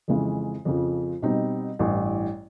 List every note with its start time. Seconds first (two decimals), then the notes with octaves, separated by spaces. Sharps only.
0.08 F2 C#3 E3 G#3
0.65 F2 C#3 F3
1.22 B2 G3 C4 D#4
1.79 A1 G2 E3